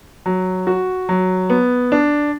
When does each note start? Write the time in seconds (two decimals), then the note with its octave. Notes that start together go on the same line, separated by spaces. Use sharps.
0.26 F#3
0.67 F#4
1.09 F#3
1.50 B3
1.92 D4